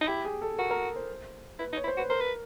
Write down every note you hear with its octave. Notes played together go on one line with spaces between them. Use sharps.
D#4
E4 G4
G#4
A4
F#4 A#4
A#4
C5
E4 B4
D#4
C#5
E4
C5
F#4 B4
A#4 C5
B4